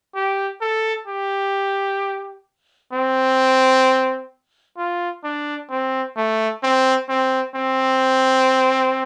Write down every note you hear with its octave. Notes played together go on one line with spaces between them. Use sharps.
G4
A4
G4
C4
F4
D4
C4
A3
C4
C4
C4